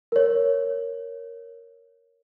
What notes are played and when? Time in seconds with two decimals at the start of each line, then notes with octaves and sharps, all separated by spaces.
0.12 A#4 C#5